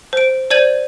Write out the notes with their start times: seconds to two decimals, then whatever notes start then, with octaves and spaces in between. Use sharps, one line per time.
0.13 C5 D7
0.51 C5 D5 G6 G#6 D#7 F#7